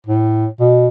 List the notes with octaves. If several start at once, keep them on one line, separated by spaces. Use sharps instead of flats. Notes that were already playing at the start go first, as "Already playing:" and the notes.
A2
B2